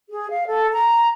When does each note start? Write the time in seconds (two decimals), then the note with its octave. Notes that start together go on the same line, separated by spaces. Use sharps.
0.10 G#4
0.29 F5
0.48 A4
0.73 A#5